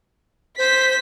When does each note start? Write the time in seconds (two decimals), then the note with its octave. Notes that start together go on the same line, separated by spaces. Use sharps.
0.58 C5 B6